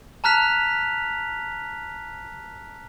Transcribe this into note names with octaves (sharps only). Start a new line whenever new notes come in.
A5 A#5 F6 F#6 B6 F7